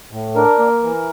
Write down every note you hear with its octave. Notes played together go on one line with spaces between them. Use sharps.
A2
D4 A#4
A#3
E3